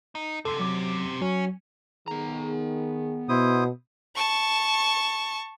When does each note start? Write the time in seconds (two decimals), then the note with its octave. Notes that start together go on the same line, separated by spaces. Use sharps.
0.15 D#4
0.45 F#2 C3 A4 C6
0.60 F#3 D6
1.22 F#3 C#4
2.08 D#3 B3 G#4 A#5
3.29 B2 E4 C5 D#6
4.15 A5 C#6